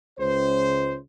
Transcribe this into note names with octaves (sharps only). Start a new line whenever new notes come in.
C#2 C5